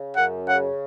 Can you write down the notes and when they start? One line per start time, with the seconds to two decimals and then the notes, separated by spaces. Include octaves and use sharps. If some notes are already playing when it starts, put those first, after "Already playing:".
Already playing: C#3
0.17 F#2 F#5
0.47 C#3 F#5